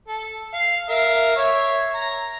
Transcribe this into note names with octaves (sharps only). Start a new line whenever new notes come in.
A4
F5
A#4 E5 F5
C#5 E5
A#5